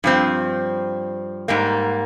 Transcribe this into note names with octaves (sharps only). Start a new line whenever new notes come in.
G2 F3 C4
G#2 G3 A#3